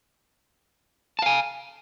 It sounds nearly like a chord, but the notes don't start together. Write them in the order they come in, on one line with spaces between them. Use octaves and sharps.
A5 F5 G#5